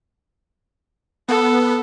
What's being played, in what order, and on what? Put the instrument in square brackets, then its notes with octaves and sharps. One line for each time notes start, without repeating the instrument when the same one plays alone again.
[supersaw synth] B3 [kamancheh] A4